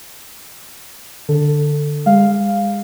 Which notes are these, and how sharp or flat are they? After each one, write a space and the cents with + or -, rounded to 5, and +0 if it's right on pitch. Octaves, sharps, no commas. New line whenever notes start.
D3 +0 A4 +10
G#3 -35 F5 +0